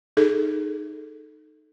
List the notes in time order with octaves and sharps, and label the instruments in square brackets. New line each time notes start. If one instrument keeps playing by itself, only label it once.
[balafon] D#4 G#4 A4